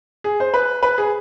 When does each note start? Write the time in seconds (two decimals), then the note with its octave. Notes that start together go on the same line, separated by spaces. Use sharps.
0.24 G#4
0.40 C5
0.54 B4
0.83 B4
0.98 G#4